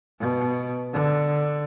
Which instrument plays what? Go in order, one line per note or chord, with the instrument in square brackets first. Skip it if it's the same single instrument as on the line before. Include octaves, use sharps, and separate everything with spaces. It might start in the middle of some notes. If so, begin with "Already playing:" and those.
[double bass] B2
D3